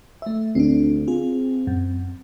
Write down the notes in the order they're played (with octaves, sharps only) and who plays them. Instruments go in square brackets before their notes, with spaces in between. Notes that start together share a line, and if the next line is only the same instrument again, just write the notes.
[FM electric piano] A3 E5
[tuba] D2 [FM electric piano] C4 D4
[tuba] C4 [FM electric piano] F4 G#4
[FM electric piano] F#2